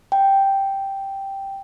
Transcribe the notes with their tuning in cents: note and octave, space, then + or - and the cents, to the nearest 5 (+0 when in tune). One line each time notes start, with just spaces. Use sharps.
G5 -5